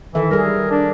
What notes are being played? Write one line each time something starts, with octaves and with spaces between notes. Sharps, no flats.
D#3 E3 A4 E5
G3 G#4 A#4
D4